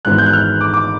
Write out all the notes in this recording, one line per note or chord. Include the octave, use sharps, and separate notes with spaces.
G#1 G#2 E3 G#3 B3 F#6
G6
F#6
F6
D6
D6